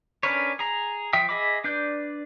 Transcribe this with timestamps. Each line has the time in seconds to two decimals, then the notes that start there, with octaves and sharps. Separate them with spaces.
0.23 C#4 D4 A#4 B4 C#5
0.59 G#4 A#5
1.13 F3 E5 G5 D#6
1.29 G#4 D#5 E5 B5 D6
1.64 D4 B4 D5 G6